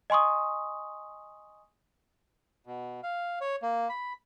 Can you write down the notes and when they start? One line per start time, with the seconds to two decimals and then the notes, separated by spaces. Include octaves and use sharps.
0.10 D#5 G#5 C6 C#6 D#6
2.66 B2
3.03 F5
3.41 C#5
3.62 A#3
3.89 B5